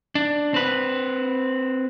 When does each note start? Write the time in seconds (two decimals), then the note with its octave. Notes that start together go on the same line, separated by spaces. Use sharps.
0.15 D4
0.54 C4 B4